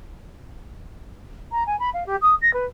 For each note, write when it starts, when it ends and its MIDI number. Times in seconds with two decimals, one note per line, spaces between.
1.51 1.63 82
1.66 1.79 80
1.79 1.90 83
1.93 2.04 77
2.06 2.16 67
2.21 2.34 87
2.41 2.53 94
2.53 2.65 71